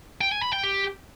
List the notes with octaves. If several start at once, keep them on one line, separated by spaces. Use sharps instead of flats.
G5
G#5
B5
G5
G4